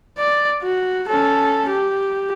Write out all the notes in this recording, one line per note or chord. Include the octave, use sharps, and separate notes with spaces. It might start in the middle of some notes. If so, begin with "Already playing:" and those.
D5
F#4
C#4 A4
G4